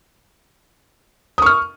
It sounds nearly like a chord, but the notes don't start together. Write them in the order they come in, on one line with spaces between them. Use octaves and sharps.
D#6 C#6 F6